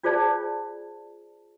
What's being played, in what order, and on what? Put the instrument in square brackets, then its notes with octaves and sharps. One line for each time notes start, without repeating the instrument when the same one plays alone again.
[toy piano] D4 F4 G#4 C5 D5 A5